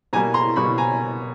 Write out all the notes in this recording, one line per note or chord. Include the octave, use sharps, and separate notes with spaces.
B2 G3 A#3 G#5 A#5
A#5 C6
B2 G3 A#3 B5 C#6
G#5 A#5